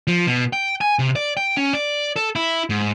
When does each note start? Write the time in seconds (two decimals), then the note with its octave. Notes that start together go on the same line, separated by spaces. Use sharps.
0.07 F3
0.27 B2
0.53 G5
0.81 G#5
0.99 C3
1.16 D5
1.37 G5
1.57 C#4
1.73 D5
2.16 A4
2.36 E4
2.70 G#2